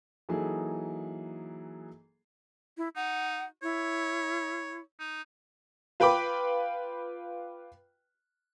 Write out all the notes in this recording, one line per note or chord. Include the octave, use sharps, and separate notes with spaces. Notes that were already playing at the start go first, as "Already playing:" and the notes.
E3 F#3 A#3 D#4 G#4 A4
E4
D#4 F#5
E4 C#5
D#4
F4 B4 G5 B5 D6